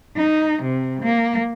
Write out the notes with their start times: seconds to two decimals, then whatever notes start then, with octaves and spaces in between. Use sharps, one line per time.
0.17 D#4
0.62 C3
1.03 A#3